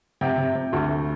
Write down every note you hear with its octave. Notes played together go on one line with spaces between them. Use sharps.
C3 G5
C3
C3
D2
A3